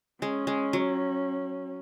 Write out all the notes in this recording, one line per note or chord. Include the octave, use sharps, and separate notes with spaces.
G#3 C#4
G#3
F#3